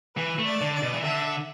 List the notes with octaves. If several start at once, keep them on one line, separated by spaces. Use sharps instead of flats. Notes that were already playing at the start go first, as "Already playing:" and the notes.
E3 B4
A3
D5
D3
D5
B2
E3
D3 E5